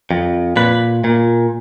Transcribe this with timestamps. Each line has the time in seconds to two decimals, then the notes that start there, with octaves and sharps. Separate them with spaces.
0.11 F2
0.56 A#2 B4
1.04 A#2